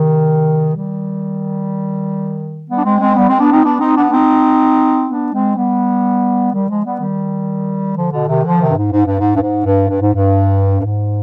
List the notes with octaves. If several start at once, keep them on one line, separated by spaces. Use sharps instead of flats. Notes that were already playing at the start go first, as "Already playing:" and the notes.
Already playing: C3 D#3
D#3 G3
G3 B3
D4
G#3 C4
G#3 C4
G3 B3
G#3 C4
B3 D4
C4 D#4
B3 D4
C4 D#4
B3 D4
D4
C4 D#4
B3 D4
G#3 C4
G3 B3
D#3 G3
F3 G#3
G3 B3
D#3 G3
D3 F3
B2 D3
C3 D#3
D3 F3
C3 D#3
G2
G#2
G#2
G2
G#2
G2
G#2
G2
G2
G#2
G2
G2
G#2